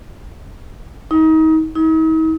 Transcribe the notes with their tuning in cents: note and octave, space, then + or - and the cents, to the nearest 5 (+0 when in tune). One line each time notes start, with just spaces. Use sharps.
D#4 +30
D#4 +45